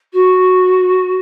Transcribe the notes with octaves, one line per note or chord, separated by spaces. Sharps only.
F#4